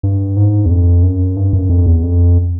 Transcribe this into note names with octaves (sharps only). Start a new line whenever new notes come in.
G2
G#2
E2
F2
F#2
G2
F#2
F2
E2
F2